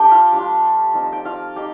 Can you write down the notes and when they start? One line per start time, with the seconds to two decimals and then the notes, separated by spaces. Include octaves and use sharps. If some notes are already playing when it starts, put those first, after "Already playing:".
Already playing: A3 D4 G4 G5
0.11 F4 F5
0.33 G3 D4 F4
0.94 F3 C4 D#4
1.12 G5
1.25 F4 F5
1.56 D#4 G4 G5